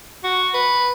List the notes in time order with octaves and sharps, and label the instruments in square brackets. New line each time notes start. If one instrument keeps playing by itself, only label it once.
[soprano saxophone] F#4
B4